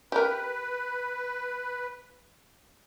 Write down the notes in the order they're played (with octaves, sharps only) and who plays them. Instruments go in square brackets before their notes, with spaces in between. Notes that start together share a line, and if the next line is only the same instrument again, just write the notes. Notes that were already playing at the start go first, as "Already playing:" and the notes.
[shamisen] G4 A#4 [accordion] B4